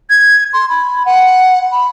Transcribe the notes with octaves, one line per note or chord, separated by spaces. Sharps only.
G#6
C6
B5
F#5
B5